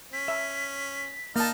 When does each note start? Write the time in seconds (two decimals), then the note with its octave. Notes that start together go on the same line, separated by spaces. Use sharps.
0.13 C#4 B6
0.28 E5
1.36 A#3 D#4 A5 F6